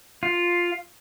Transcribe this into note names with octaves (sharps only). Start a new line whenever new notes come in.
F4